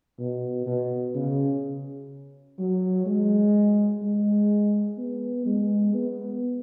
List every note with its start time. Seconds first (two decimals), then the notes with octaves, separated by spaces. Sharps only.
0.19 B2
0.66 B2
1.14 C#3
2.58 F#3
3.06 G#3
4.02 G#3
4.98 B3
5.46 G#3
5.93 B3